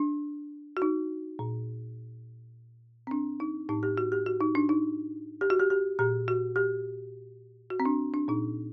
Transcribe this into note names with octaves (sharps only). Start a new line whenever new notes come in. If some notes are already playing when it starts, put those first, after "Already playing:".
Already playing: D4
F#4
D#4
A#2
C4
D4
D#4
A2 D#4
G4
F#4
G4
F#4
D#4
D4
D#4
G4
F#4
G4
G4
A#2 G4
F#4
G4
F#4
C4
D4
D4
A#2 D#4